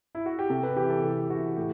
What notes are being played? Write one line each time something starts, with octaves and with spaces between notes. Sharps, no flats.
E4
F#4
G4
C3 A4
B4
E3 G4
A4
C3 G4
G4
E3 F#4
A2 G4